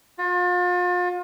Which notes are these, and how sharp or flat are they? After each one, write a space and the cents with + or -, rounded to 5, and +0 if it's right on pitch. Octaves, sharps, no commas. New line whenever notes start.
F4 +40